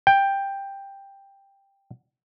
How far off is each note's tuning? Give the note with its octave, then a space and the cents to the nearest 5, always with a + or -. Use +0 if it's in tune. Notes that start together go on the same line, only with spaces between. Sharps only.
G5 +10